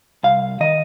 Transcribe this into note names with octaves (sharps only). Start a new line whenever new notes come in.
C2 F5
D#3 D#5